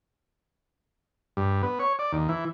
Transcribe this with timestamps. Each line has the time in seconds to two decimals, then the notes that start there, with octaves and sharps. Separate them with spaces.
1.37 G2
1.63 B3
1.79 C#5
1.99 D5
2.12 D#2
2.29 E3